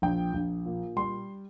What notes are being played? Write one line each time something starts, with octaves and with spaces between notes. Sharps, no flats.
A#1 G5
A#1
A#2
G3 C6